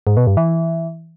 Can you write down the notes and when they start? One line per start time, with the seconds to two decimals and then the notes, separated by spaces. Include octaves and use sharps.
0.07 G#2
0.17 B2
0.27 G2
0.37 E3